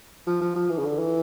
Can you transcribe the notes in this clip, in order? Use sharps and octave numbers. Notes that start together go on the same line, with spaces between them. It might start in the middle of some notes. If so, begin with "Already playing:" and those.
F3
F3
F3
E3
C#3
D3
E3